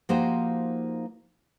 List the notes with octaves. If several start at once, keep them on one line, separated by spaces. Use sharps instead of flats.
F3 A#3 D#4 F#4 G4 C5